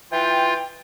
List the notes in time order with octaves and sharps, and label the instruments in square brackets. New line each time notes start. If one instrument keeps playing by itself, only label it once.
[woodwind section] E3 G5 [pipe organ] F4